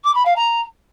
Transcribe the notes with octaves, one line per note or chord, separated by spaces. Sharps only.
D6
B5
F5
A#5